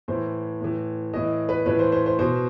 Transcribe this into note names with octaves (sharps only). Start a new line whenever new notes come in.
A2 E3 C5
A2 E3
A2 E3 D#5
B4
A2 E3 B4
C5
C5
C5
B2 C5